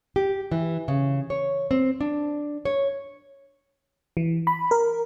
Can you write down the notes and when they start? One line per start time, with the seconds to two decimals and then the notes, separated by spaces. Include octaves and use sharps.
0.16 G4
0.52 E3
0.88 C#3
1.30 C#5
1.71 C4
2.01 D4
2.65 C#5
4.17 E3
4.47 B5
4.71 A#4